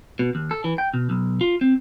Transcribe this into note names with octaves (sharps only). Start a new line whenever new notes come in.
B2
D#2
A4
E3
G5
B2
B1
F4
C4